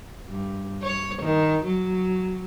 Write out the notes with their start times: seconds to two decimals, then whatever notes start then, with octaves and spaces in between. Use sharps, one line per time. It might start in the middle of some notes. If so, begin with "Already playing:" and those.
0.28 G2
0.83 C#5
1.22 D#3
1.65 F#3